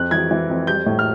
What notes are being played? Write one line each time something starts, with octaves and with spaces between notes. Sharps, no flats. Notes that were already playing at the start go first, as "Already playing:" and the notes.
Already playing: F2 F#6
E3 G#6
E3
F2
G3 G6
A2
F6